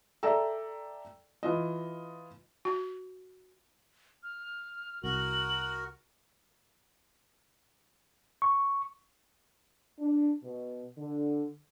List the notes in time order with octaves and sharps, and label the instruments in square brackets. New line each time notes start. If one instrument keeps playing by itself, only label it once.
[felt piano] A4 D5 E5 G5 A#5 E6
E3 F4 D#5
[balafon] F#4
[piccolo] F6
[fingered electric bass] C2 [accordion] F#4 A#4 [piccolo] F#7
[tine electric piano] C#6
[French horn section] D4
B2
D3